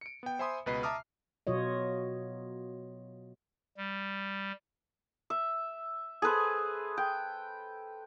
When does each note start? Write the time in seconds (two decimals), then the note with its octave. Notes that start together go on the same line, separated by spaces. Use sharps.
0.01 C#7 D7
0.23 B3 G5
0.39 C5 E5 G#5 B5 C6 D#6
0.66 C#2 B2 B4 D#5 B5 C7
0.83 E5 A5 A#5 D6 D#6 F6
1.47 B2 F#3 F4 C#5 D#5
3.77 G3
5.30 E5
6.22 G#4 A4 B4 C5
6.97 G5